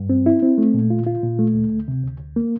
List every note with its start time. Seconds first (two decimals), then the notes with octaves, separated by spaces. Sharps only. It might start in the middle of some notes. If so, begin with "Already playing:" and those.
Already playing: G2
0.10 C4
0.26 E4
0.42 C4
0.58 A3
0.74 A#2
0.90 F4
1.06 F4
1.23 A#2
1.39 A3
1.55 D2
1.72 D2
1.88 C3
2.04 D2
2.20 D2
2.36 A#3